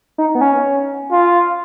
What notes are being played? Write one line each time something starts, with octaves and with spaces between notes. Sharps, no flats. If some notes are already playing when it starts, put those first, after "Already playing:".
D#4
B3
C#4
F4